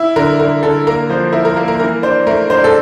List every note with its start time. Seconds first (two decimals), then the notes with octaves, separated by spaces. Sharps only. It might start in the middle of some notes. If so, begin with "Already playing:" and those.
Already playing: E4
0.16 D3 A#4
0.39 D3 A#4
0.63 D3 A4
0.87 A#3 A#4
1.10 F3 C5
1.33 E4 A#4
1.45 A#4
1.56 A#3 A#4
1.68 A#4
1.80 E3 A#4
2.02 D4 C5
2.27 A3 A#4
2.50 D4 C5
2.64 A4